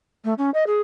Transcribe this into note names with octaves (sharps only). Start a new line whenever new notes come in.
A3
C#4
D#5
G#4